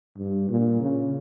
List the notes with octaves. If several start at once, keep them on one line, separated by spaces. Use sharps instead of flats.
G2
A#2
C#3